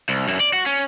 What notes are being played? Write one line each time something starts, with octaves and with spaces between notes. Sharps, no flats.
C2
F#2
D5
F#4
C#4